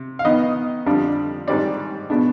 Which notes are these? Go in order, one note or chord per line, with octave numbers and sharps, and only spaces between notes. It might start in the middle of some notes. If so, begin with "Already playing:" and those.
Already playing: C3
F5
D#3 B3 D#4 D#5
F2 D3 G3 D4
G#2 D#3 G3 C4 D5
B2 G#3 B3 D4